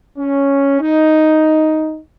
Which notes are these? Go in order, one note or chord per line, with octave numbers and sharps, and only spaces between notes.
C#4
D#4